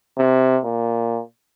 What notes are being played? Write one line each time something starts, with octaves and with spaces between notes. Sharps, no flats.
C3
A#2